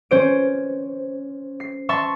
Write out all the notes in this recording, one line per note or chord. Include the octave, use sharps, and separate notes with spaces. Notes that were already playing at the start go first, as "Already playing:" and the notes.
C#4 C5 D7
C7
E5 A5 C6 C#6